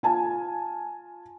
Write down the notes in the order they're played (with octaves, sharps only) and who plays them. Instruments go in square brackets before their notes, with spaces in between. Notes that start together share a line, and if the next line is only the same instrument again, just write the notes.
[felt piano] F4 G#5 A5